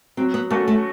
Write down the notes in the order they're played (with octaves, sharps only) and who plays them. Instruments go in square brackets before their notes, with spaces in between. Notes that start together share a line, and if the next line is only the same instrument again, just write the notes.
[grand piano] F#3 [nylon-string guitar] C4
[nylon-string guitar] B3
[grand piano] A3 C#4 F#4 A4 [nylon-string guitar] A#3
[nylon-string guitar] A3